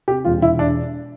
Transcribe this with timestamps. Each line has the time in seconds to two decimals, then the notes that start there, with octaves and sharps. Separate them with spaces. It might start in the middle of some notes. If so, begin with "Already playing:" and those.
0.08 C3 G4
0.25 E1 F4
0.42 E1 E4
0.59 D4